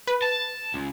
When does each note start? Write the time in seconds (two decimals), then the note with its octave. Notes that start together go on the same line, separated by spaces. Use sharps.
0.08 B4
0.22 A5
0.74 C#2